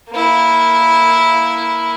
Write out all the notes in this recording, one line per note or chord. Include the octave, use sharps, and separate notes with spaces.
A#3 E4